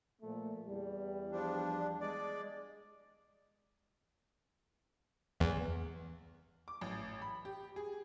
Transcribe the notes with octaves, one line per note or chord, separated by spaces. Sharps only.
A#2 F3 A3
E2 G3
F3 D4
G#3 D5
E2
D6
A1
B5
G4
G#4